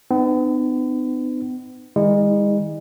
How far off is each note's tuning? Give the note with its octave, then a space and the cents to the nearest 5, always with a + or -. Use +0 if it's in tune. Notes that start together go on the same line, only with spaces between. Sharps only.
B3 +40 D#4 -40
D#3 +0 G#3 -35 E4 -45